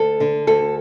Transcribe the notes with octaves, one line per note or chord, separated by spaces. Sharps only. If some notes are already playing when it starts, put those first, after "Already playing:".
Already playing: D2 A4
D3
D2 A4